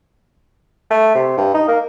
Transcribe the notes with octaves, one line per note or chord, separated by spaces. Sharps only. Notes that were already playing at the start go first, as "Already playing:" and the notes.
A3
C3
G2
D#4
A#3